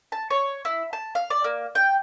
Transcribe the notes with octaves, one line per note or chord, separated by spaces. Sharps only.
A5
C#5
E4
A5
F5
D5
A#3
G5